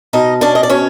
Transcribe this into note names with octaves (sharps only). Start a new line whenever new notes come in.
B2 D#4 D#5
C#4 D4 D5
D#5
D5
B2 C#4 C#5